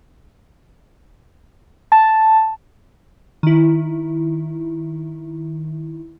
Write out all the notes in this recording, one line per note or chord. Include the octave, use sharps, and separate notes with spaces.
A5
D#3 E4